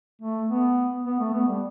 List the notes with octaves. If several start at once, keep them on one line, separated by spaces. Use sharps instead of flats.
A3
B3
B3
A3
B3
G3